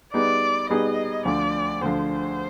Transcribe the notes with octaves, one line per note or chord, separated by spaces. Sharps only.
G3 B3 D#4 G#4 D5
G3 B3 D#4 G#4 D#5
D2 D3 F3 D5
D2 D3 F3 C5